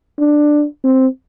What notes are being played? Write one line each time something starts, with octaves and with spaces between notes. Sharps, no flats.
D4
C4